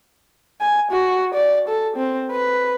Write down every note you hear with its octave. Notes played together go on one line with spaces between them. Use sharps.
G#5
F#4
D5
A4
C4
B4